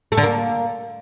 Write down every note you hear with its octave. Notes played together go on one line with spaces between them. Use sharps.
A3
D3
A#3